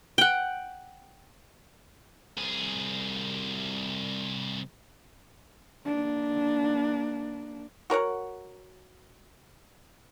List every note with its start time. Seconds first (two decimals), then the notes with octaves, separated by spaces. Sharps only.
0.18 F#5 G5
2.38 C2 G#4
5.85 A#3 D4
7.90 F#4 A#4 C#5 F#5